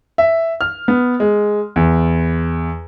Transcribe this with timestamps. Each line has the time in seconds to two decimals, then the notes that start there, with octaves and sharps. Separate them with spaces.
0.18 E5
0.61 F6
0.88 B3
1.20 G#3
1.76 E2